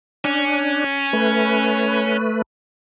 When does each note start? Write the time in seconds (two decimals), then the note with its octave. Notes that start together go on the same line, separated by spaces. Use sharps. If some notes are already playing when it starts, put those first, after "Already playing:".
0.25 C#4 D4
1.13 A3 B4